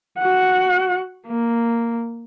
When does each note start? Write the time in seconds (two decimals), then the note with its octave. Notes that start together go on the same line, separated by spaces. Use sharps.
0.18 F#4 F#5
1.28 A#3